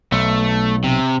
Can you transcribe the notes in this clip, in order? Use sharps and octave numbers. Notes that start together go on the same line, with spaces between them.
B1 A3
C3